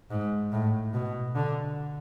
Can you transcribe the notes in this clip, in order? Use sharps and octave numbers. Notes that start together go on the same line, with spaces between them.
G#2
A2
B2
D3